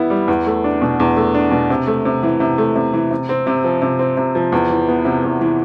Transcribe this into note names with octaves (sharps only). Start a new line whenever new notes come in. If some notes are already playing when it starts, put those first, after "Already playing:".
Already playing: E3 G3 B3 E4
G3
E2
A3
D4
B2
E2
A3
D4
B2
C3
A3
C3
E3
C3
A3
C3
E3
C3
C4
C3
F3
C3
C4
C3
F3
E2
E3
B3
C3
E2
E3